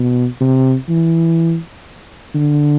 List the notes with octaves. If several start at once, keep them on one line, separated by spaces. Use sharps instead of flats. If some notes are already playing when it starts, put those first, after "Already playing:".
Already playing: B2
C3
E3
D3